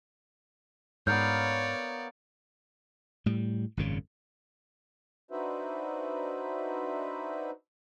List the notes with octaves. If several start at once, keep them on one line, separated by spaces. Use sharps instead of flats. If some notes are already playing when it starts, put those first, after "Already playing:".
G#2 B3 A#4 C#5 D5 F5 G6
A2 G3
G#1 F#2 A#2 C#3
D4 D#4 F#4 B4 C5 E5